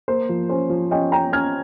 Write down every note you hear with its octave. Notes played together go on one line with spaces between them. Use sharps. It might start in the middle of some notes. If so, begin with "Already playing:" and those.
A#3 C5
F3
C#4 C5
F3
C#4 D#5 G5
C#4 G5 A#5
C#4 F6 G#6